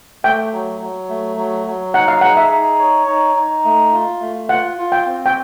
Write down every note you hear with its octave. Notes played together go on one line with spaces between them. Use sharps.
A3 G5
F#3
F#3
A3
F#3
F#3
D#4 F#5
F5
G#4 F#5
E5
D#4
C#5
D#4
D#4
A3
F4
A3
F4 F#5
F4
G5
C4
G5